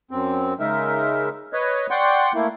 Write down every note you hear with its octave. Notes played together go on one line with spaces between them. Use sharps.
F#2 C4
C#3 G#3 D#4 A#4 E5
B4 C#5 D#5
D5 F#5 G5 C6 C#6
A3 A#3 E4